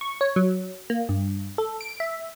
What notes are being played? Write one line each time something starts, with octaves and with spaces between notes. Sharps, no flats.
C#6
C#5
F#3
A#3
G2
A4
D7
E5